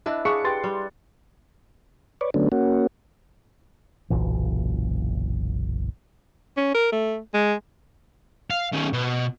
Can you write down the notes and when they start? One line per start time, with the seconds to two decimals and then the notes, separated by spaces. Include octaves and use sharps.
0.06 D4 E4 B4 D#5 E5 B5
0.25 D4 G#4 F5 B5 C#6 D#6 F#6 C#7
0.45 G4 B4 G5 C6 A6
0.64 G3 C#6
2.21 B4 C#5 D5
2.34 D3 F#3 A3 B3 C#4 D4
2.52 A#3 C#4 F#4
4.10 F#1 B1 A#2 E3
6.57 C#4
6.74 A#4
6.92 A3
7.34 G#3
8.51 F5
8.72 D#3 C#4
8.93 B2